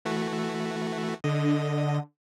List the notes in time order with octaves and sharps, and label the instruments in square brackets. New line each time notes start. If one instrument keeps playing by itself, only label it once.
[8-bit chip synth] E3 A3 F#4
[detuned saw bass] D3 [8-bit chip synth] D#5